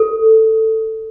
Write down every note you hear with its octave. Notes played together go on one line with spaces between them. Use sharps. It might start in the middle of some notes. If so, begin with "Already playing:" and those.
Already playing: A4